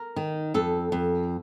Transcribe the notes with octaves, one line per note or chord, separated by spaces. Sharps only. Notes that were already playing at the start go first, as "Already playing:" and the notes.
Already playing: A#4
D#3
F2 A4
F2